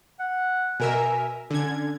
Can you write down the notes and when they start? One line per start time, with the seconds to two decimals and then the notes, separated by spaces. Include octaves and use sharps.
0.19 F#5
0.80 B2 A#4 E5 G#5
1.50 D3 C#4 G#6